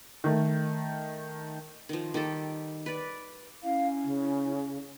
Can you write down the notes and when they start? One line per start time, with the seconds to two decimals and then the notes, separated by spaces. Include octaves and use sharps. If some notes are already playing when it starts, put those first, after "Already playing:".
0.24 D#3 A3
1.89 D#3 F3
2.14 D#3 G3 G4 A4
2.86 B4 D5
3.63 C#4 E4 F5
4.04 C#3